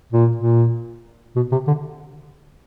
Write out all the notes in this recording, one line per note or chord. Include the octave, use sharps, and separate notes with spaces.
A#2
A#2
B2
C3
D3